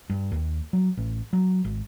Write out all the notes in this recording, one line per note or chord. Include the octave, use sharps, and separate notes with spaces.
G2
D#2
F#3
A1
F#3
G#1